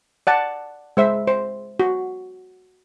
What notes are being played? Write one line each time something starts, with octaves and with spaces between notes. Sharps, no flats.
D5 F#5 A5
G#3 C5 E5
C5
F#4